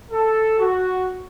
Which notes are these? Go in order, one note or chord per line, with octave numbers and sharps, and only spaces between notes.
A4
F#4